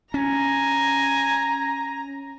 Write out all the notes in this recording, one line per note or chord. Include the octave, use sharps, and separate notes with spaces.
C#4 G#5 A#5